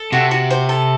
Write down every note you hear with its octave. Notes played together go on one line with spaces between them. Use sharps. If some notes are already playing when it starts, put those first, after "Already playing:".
Already playing: A4
C3 F#4
F#4
C5
A4